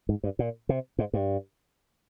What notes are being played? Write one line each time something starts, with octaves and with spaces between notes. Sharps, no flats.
G#2
G2
A#2
C3
G#2
G2